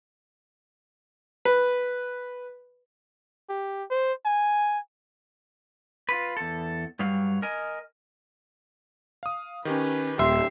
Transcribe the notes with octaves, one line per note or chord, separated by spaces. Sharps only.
B4
G4
C5
G#5
F4 B4
E2 A4
G2 F#3 G3 F5
A#4 D#5 G#5
F5 D#6
D#3 C#4 G4 B4
D#1 G4 E5 C6 C7